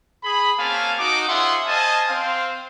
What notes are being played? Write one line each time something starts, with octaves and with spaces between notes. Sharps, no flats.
G#4 B5
A#3 C4 C#4 F5 G#5 A5
D#4 F#4 D6
C#4 F4 G#4 E5 F#5 C6
C5 D#5 F5 G#5 A5
C4 C5 F5